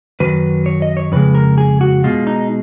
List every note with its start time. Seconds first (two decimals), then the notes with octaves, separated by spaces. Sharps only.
0.20 F#2 D#3 F#3 B4
0.66 C#5
0.82 D#5
0.97 C#5
1.12 F2 C#3 G#3 B4
1.35 A#4
1.58 G#4
1.81 F#4
2.04 B2 G#3 F4
2.27 D#4